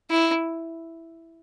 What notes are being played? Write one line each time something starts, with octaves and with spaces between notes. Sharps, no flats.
E4